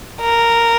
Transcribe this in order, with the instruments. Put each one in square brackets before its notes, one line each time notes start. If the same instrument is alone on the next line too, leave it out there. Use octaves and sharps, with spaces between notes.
[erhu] A#4